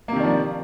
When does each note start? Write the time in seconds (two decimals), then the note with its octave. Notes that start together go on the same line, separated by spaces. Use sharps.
0.08 A#3
0.12 C3
0.16 D#3
0.20 D4
0.24 F3